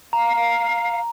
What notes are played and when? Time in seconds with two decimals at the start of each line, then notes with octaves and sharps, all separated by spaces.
0.13 F5 A#5